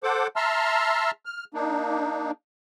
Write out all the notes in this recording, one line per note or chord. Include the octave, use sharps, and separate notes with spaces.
A4 C5 F#5 D6
E5 A5 A#5 C6 E6 F6
F6
A#3 D4 D#4